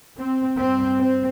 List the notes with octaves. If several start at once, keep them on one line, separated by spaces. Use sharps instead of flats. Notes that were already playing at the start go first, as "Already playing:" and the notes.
C4
G2 C4
C4